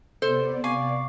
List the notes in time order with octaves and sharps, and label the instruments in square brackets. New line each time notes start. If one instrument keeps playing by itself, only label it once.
[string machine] C3 B3 D5 [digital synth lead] A4 [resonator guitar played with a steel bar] C5
[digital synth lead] F5 [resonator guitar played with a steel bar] G#5 [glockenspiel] C#6 D6 C7